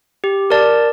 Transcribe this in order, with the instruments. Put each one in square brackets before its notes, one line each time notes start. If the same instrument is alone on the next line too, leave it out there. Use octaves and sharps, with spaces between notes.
[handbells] G4
A#4 D5 A5